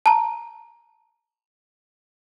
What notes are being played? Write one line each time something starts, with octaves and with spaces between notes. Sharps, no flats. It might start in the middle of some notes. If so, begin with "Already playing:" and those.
A5 A#5